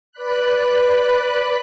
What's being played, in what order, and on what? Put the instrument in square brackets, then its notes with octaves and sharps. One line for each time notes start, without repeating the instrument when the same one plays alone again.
[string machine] B4 D5 B5 F#6